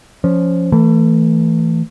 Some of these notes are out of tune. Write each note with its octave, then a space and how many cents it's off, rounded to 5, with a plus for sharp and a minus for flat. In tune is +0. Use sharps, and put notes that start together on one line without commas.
F3 +0 C#4 +15
E3 +0 A3 +30